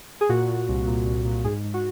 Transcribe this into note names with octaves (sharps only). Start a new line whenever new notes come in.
G#4
A#2 F#4
A#2
C2
A#2
C2
A#2
G#2 G#4
G#2
F#4